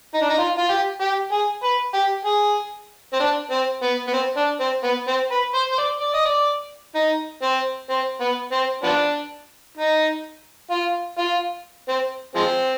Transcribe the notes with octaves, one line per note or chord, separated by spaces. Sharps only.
D#4
D4
D#4
F4
F4
G4
G4
G#4
B4
G4
G#4
C4
D4
C4
B3
B3
C4
D4
C4
B3
C4
B4
C5
C5
D5
D5
D#5
D5
D#4
C4
C4
B3
C4
F3 B3 D4
D#4
F4
F4
C4
F3 G#3 C4